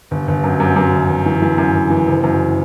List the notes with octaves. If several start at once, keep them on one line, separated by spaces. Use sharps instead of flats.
G1
G1
F#2
F#2
F#2
G1
G1
E3
E3
F#2
G1
E3
F#1
F#2